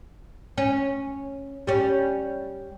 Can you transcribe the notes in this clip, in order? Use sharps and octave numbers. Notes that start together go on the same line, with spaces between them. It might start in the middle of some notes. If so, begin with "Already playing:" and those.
C#4
G3 C#4